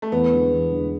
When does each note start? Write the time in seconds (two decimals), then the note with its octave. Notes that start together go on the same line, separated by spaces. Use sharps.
0.02 A3
0.12 E2 B3
0.32 D3 G#3
0.52 E2
0.72 D3 G#3